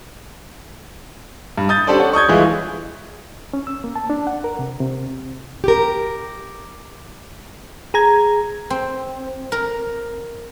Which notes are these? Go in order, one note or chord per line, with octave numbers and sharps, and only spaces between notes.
G2
D#6 G6 A6
C#4 D4 G4 A4 C5 D5
C#5 D5 F#5
C#6 D#6 G6 G#6
G1 E3 G#3 E4 F4 G#4
C#4
E6
A#3
A5
D4
F#5
A#4
C3
C3
G4 A#4
G#4 A#5 G#6
C4
A#4